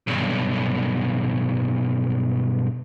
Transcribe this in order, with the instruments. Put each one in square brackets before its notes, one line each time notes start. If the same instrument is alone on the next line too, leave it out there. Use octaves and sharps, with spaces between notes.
[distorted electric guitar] B1 G2